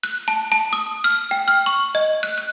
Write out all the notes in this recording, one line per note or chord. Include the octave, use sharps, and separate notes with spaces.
F#6
A5
A5
D#6
F6
G5
F6
C#6
D#5
F#6
F#6